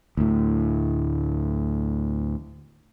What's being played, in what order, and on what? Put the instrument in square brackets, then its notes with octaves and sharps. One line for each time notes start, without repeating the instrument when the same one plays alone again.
[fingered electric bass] D2 A2